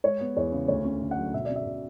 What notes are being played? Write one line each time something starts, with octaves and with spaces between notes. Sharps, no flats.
G#3 C#5
B3
E2 C#5
C#3
D2 C#5
C#4
D3
F#5
F#3
B2 E5
C#4 D5
E5
B2